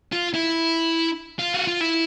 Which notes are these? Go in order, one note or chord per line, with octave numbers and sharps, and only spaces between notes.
F4
E4
F4
F#4
F4
E4